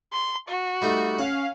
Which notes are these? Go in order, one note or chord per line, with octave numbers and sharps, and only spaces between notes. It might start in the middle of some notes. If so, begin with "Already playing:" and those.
C6
F#4
G3 A3 D#4
C#4 F5 F#5